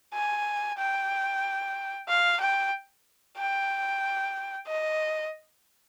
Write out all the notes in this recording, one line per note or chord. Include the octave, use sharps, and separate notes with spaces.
G#5
G5
F5
G5
G5
D#5